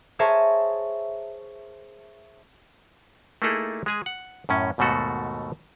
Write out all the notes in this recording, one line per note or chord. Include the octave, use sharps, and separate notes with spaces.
G#4 A#4 C5 C#5 E5 A5
A3 A#3 D#4 E4 G#4 A4
G#3 G#4 G#5
F#5
F#2 A2 C#4
D#2 G#2 B2 A3 F#4 A4